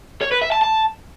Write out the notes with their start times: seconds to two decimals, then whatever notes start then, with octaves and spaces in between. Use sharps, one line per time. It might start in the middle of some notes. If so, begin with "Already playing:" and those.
0.21 C#5
0.31 B4
0.42 E5
0.52 A5
0.62 A5